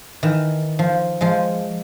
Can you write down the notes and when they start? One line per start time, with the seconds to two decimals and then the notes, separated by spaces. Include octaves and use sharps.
0.23 D#3 E3
0.79 F3
1.21 F3 G#3